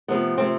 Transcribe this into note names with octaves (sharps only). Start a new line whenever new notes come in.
C3 F3 A3 B3
C3 F3 A3 C4